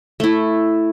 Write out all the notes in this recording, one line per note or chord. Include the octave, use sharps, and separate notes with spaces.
A3 E4